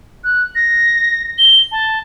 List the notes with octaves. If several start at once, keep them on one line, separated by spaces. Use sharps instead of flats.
F#6
A#6
G7
A5